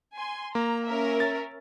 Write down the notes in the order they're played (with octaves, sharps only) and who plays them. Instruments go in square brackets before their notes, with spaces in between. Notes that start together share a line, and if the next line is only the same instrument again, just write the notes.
[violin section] G#5 C6
[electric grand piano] A#3 [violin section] A#5
[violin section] C#4 A#4 E5
[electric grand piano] A6